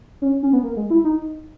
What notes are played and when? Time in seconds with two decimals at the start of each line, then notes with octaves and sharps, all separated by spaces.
0.22 C#4
0.43 C#4
0.53 B3
0.63 A#3
0.77 G#3
0.90 E4
1.04 D#4